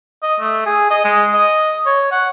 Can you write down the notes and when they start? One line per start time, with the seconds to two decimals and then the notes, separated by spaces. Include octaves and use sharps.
0.23 D#5
0.40 A3
0.66 G#4
0.90 D#5
1.04 G#3
1.33 D#5
1.86 C#5
2.12 F#5